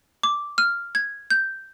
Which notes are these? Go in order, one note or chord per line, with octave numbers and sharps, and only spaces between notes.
D6
F6
G#6
G6